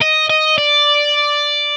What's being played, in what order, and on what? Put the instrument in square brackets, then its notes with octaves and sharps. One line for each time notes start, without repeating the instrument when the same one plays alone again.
[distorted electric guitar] D#5
D#5
D5